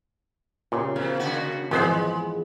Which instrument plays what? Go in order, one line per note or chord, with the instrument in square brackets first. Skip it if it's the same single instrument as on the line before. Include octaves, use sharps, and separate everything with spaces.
[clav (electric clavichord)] A#2 [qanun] C#3 G4
[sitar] B2 [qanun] A#3 F5 G#5
[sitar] B2 D3 F#4
[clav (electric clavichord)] G#1 F2 C5 [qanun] E3 F3 B3 [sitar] G#3